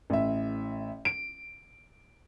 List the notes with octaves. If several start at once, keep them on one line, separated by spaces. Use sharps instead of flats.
A1 E5
D7